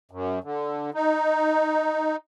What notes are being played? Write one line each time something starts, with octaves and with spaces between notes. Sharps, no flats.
F#2
D3
D#4